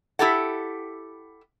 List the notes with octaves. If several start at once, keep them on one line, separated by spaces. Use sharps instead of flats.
E4 G4 A4 F#5